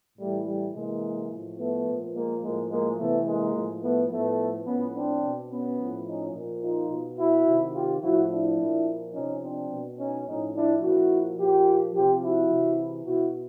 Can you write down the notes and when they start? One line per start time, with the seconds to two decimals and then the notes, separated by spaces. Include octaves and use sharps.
0.18 A2 E3 G3 A3
0.46 G3 A3
0.74 C3 E3 G#3 A#3
1.30 A2 F3
1.58 A3 B3
1.86 A#2 F3
2.14 G#3 A#3
2.42 A2 F3 G#3 A#3
2.70 G#3 A#3
2.98 C3 E3 A3 B3
3.26 G#3 A#3
3.54 A2 F3
3.82 A3 B3
4.10 A2 F3 A3 B3
4.66 A2 F3 B3 C#4
4.94 C4 D4
5.22 B2
5.50 B3 C#4
5.79 A2 F3
6.06 C#4 D#4
6.34 A#2 F3
6.62 D#4 F4
6.90 B2
7.18 E4 F#4
7.46 C3 D#3
7.74 F4 G4
8.02 A2 F3 E4 F#4
8.30 D4 E4
8.59 A#2 F3
9.14 C3 F3 C#4 D#4
9.42 C4 D4
9.71 B2
9.98 C#4 D#4
10.26 A2 F3 C#4 D#4
10.54 D4 E4
10.82 A#2 F3 E4 F#4
11.38 A#2 F3 F4 G4
11.94 C3 F3 F4 G4
12.22 E4 F#4
12.51 C3 E3
13.06 B2 E4 F#4